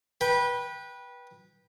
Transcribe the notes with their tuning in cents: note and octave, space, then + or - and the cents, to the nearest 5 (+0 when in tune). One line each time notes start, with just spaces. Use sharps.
B4 -20 G5 +0